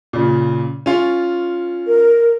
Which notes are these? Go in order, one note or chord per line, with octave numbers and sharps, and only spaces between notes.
A#2 C#3
C#4 F4
A#4